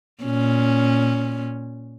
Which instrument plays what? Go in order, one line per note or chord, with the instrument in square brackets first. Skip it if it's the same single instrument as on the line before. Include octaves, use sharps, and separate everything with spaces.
[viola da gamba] A#2 C#4